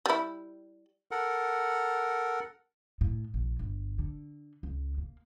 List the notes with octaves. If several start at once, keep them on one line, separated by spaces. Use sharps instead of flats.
G3 E4
A4 A#4 F#5
A2
A#1
G1
D3
C#2
A#3